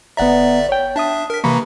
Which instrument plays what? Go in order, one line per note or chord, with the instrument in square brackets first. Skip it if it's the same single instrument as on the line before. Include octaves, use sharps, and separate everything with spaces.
[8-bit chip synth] G1 D5 E5 [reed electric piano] B3 F#5 A#5
[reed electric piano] C#5 G5
[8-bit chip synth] D4 E5 [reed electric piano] A5 D#6
[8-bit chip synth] A#4 B6
[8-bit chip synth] C3 E3 A#3 [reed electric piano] A#5 B5 C#6